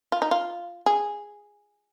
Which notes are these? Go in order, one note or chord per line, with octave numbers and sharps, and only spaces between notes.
F4
D#4
F4
G#4